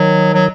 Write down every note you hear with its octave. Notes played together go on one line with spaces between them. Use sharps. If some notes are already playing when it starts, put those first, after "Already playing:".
Already playing: D#3 F#3
F#3